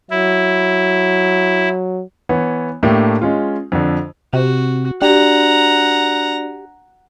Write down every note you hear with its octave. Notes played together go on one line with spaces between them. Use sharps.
F#3 E4
E3 B3 C#5
A2 A3 A#3 D4 G4
G#3 C#4 F4
F2 D3
C3 F#4
D4 F#4 G4 D5 F#5 A#5